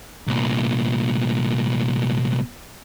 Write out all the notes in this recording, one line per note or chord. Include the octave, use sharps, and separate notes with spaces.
C2 A#2